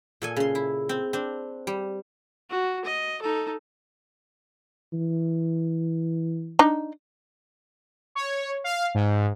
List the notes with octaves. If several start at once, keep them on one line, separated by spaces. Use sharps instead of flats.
A#2 A4 G#5
C#3 C6
E4
C4
C4 D4
G3
F#4
D#5
D#4 A4
E3
D4 D#4
C#5
F5
G#2